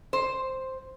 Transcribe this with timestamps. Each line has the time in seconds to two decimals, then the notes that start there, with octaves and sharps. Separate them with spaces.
0.13 C5